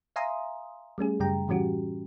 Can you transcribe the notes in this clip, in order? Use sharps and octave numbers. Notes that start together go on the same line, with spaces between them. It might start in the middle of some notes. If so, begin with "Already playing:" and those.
E5 F5 G#5 A#5 C6 D#6
G3 A3 C#4 G#4
F#2 C#3 G3 G5 A#5
A2 E3 G3 C#4 F#4 G4